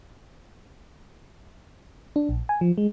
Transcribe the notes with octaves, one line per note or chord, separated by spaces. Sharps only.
D4
A#1
G#5
F3
G#3